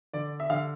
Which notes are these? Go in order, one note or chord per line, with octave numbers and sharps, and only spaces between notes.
D3 D5
E5
D3 F5